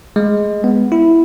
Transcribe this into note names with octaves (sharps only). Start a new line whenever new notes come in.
G#3
B3
E4